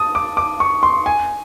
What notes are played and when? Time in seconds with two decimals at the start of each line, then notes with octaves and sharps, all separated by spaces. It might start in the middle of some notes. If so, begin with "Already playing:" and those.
Already playing: A5 D#6
0.15 D6
0.37 D6
0.60 C#6
0.83 C6
1.06 G#5